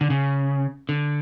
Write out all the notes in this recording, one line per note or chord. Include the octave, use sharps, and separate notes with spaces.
D3
C#3
D3